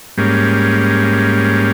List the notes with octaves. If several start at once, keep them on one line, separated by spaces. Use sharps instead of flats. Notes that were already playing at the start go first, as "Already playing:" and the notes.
G#2 G3 A#3 C#4